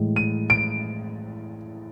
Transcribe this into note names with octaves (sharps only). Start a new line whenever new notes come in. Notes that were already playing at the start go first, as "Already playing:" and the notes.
Already playing: A2 E3 G#3
D#7
D7